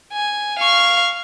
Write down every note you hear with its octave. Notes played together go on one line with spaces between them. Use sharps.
G#5
F5 C#6